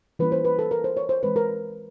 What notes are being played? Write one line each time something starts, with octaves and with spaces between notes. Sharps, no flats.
E3 G3 A#3 C#4 B4
C5
B4
A4
A#4
C5
C#5
C5
E3 G#3 C4 B4
A#4